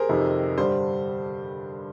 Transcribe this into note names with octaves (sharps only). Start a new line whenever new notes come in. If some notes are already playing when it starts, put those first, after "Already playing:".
Already playing: G4 G#4 A#4 C5
F2 C3 D#3
G2 D3 G3 C5